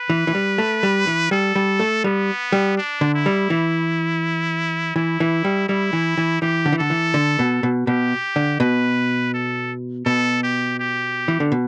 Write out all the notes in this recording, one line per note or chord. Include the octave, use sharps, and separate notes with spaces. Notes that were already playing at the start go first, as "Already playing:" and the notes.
Already playing: B4
E3
E3
G3
A3
G3
E3
G3 A4
G3
A3
G3 B3
G3
D4
D3
E4
G3
E3
E3 E4
E3
G3
G3 E4
E3
E3
E3 G4
D3
E3
D3 A4
E3
D3
B2
B2
B2 G4
D3
B2 B4
A4
B2 A4
G4
G4
E3
D3
B2